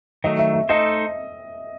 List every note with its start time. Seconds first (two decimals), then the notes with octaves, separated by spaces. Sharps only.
0.24 D#3 F#3 A3 D#5
0.39 E5
0.54 E5
0.69 A3 D#4 A4 C5 D#5